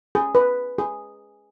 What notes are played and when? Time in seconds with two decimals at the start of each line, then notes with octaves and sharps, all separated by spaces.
0.15 G#4
0.35 B4
0.78 G#4